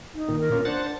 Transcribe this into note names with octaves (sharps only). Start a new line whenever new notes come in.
D#4
A#2 D#3
A#4
A#3 C#4 F4
D4 C5 F#5 A6